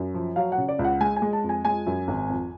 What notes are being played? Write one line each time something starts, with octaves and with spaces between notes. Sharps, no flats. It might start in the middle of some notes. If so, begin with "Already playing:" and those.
Already playing: F#2
F3
F#3 F5
F#5
C#3
D5
C#2
F#5
G#3 G#5
G#5
G#3
A5
F2
G#5
G#3 G#5
F#2
G#1
F2